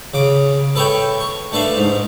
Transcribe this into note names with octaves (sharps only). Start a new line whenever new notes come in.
C#3 D6
A4 B4 C#5 E5 G5
C#6
A3 D4 B4 E5 F5
G#2